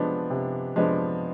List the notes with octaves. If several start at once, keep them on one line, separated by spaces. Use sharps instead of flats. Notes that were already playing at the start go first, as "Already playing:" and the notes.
Already playing: C3 F3 G#3 B3 D4
C3
F3 G#3 B3 D4